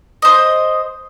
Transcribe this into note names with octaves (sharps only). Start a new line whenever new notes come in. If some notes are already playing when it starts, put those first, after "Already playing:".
C5 D#5